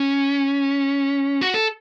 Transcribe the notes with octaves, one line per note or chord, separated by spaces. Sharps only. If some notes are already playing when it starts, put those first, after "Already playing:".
Already playing: C#4
F#4
A4